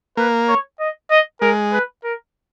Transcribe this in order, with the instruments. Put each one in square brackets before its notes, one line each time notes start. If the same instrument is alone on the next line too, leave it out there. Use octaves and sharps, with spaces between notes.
[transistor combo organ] A#3 [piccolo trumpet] B4
[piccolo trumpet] C#5
D#5
D#5
[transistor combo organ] G#3 [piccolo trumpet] A#4
[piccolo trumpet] B4
A#4